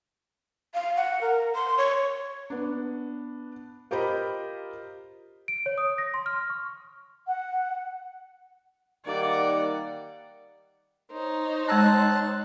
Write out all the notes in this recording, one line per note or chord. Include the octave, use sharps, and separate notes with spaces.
F5
F#5
A#4
C6
C#5
B3 D4
F4 G4 A#4 C5 D#5 B5
D7
C#5
D#6
A#6
C6
F6
C#6
F#5
D#3 G3 A#3 D5 F#5
D#4 C5 C#5
G#3 A5 E6 F#6 A#6